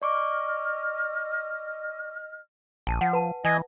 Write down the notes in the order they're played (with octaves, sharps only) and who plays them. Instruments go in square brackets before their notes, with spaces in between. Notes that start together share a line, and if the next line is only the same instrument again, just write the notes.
[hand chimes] D5 C#6 D6 [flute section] D#5 F6
[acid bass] A#1 [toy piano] G#5 A5
[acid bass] F3 [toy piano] F#5
[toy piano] B4 A5
[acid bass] E3 [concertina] D#5 G#5